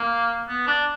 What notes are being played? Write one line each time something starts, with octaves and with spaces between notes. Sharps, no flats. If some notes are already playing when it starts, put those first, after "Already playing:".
Already playing: A#3
B3
D4